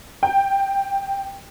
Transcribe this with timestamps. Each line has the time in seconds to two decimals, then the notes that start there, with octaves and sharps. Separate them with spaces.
0.23 G5